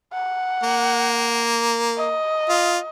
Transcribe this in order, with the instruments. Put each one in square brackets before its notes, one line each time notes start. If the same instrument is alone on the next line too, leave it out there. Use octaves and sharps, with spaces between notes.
[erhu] F#5
[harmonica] A#3
[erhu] D#5
[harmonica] F4